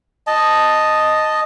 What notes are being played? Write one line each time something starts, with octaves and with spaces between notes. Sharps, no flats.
D#5 A5